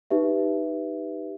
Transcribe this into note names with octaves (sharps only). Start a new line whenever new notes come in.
D#4 G4 B4 E5